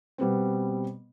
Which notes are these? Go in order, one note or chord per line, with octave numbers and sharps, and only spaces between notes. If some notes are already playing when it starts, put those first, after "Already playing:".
B2 G3 B3 C4